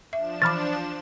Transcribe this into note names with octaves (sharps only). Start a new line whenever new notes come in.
F3 D4 E5 E7
E3 B5 D6 F6 A6